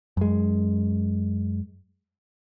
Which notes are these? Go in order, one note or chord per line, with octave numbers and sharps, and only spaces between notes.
F#2 G#3